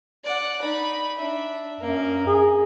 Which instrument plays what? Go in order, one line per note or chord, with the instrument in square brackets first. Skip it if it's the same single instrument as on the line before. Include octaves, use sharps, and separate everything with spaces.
[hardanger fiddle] D5 F#5
D#4 B5
D4 E5
[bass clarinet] F#2 [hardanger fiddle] A#3 A#5
[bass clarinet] G#4